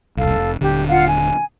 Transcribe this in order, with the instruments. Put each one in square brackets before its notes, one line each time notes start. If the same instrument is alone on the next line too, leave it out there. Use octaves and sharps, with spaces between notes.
[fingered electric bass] E1 C2 [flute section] A4 F5
[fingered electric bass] F1
[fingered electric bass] D#1 D3 [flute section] G4
[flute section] F4 F5 F#5
G#5